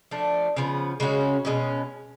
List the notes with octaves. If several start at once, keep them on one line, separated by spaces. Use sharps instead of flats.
F3 A3 D4
C#3 F3 B3
C#3 G#3 C#4 F#4
B2 G#3 C#4